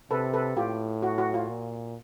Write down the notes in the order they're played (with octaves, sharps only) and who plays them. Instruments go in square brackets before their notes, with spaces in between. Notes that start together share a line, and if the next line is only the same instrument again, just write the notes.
[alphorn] C3 [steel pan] A4 B4
[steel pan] A4 B4
[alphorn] A2 [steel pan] F4 G4
[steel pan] F#4
F#4
F4
[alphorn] A#2